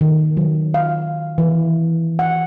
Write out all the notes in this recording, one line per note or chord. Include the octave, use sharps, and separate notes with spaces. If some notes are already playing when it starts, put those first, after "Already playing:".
D#3
F#3
F5
E3
F#5